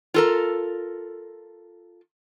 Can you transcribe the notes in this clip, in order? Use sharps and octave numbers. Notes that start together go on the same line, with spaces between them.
F4 A4 A#4